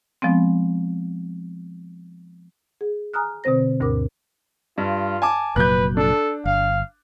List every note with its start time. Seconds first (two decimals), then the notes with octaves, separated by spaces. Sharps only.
0.22 F3 G#3 B3 C4
2.81 G#4
3.14 G#5 A#5 D#6 F6 F#6
3.44 B2 D3 C4 C5 A#6
3.80 D2 G2 B2 A#4 D6
4.78 G2 F4
5.22 G#5 A5 D6
5.56 F1 A#2 F#3 B4 F#6 G6
5.97 D4 A4
6.46 G1 F5